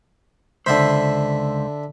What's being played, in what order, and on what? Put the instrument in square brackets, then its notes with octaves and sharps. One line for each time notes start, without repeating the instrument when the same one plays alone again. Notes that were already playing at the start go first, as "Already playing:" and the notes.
[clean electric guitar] C#2 C5 [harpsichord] D3 E5 B5